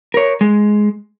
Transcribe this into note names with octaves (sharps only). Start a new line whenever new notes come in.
A#4 C#5
G#3